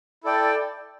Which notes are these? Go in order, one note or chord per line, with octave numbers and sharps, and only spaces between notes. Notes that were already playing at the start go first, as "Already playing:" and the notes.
E4 A4 D5 G5